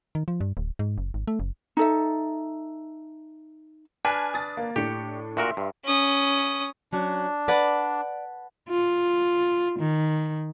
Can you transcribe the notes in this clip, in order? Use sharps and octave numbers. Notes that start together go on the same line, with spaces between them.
D#3
F3
G2
D1
G#2
F#1
G#1
A3
F#1
D#4 A4 E5
D4 B4 G#5 A5 F6
D#6 A6
A#3
A2 D4 G4 C#7
A#2 F#4 A#4 E5 C6
G2
C#4 D#6
F#3 C#4 D4 F#4
B4 D5 F#5 A5
F4
D#3